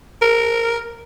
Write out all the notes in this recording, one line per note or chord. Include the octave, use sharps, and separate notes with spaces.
A#4